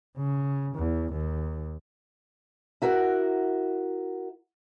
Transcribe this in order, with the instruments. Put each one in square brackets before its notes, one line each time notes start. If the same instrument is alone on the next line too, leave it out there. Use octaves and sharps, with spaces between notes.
[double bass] C#3
E2
D#2
[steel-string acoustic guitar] E4 F#4 A#4 F#5